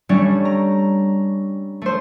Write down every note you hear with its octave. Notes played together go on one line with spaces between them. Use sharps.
G3 A3 C#4 D4
A#5
A3 C5